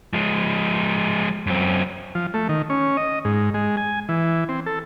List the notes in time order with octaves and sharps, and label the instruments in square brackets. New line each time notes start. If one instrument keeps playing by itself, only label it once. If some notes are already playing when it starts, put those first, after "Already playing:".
[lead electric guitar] F3 G#3
F#2 C4
[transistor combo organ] F3
A3
D#3
C#4
D#5
G#2
G#3
G#5
E3
C4
A4